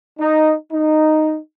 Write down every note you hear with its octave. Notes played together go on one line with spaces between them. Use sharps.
D#4
D#4